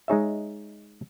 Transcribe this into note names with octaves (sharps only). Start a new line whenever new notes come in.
G#3 D#4 G#4 C#5 E5